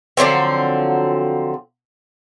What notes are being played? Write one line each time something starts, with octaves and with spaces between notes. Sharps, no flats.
D3 F3 F#3 C4